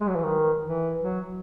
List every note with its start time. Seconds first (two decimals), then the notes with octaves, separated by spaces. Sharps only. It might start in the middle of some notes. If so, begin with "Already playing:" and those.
0.01 G#3
0.08 F#3
0.16 E3
0.23 D#3
0.63 E3
1.02 F#3